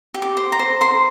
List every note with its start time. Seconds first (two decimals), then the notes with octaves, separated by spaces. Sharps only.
0.14 G4
0.22 D6
0.37 C5
0.52 A#5
0.59 C5
0.81 C5 C6